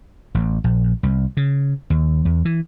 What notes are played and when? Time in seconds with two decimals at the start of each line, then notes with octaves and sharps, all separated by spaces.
0.35 A1
0.64 A#1
1.03 C2
1.37 C#3
1.90 D#2
2.25 E2
2.45 E3